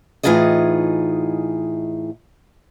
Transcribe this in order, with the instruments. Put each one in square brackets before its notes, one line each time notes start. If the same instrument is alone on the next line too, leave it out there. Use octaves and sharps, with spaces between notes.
[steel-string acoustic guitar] A2 E3 D#4 F4 G#4 D#5